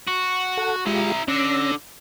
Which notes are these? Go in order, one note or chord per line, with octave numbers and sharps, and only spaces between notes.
F#4
A4 F#5
G#3 E4 F4 G4 A#5
D3 C#4 E6 A#6